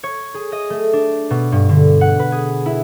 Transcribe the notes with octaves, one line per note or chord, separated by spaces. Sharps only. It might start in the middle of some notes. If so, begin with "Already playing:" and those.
C#5
G#4
D#5
A3
D4
B2
G2
D3
F#5
B4
G#4
E4